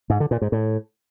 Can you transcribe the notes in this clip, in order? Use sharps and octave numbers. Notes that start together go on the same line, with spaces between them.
G#2
D3
A#2
G#2
A2